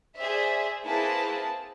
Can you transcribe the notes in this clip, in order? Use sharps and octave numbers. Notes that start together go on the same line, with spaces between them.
G#4 C5 D5 E5
A#3 C4 E4 G#4 B4 A5